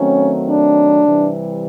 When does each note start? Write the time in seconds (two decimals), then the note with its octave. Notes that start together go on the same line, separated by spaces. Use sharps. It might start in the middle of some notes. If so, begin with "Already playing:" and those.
Already playing: D#3 F#3 A3 C4 C#4
0.49 D4
1.05 C3 E3 G3